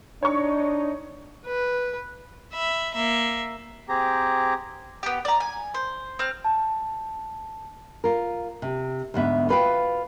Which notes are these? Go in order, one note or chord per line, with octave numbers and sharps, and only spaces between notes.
D4 D#4 C#5 C#6
B4
E5 B5
A#3 E5
C4 G4 G#4 A#5
B3 G4
D5 A#5
G#5
C5
C4 F6
A5
F4 A#4
C3
D2 G#2 B3 E5
F4 F#4 B4 C5 F5 G5